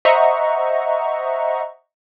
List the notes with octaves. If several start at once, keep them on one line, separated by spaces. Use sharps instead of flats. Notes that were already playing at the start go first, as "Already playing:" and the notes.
C5 D#5 E5 F#5 A#5 C#6